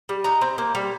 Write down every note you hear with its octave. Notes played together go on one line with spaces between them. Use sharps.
G3
D#4 A#5
C4
A#3
G3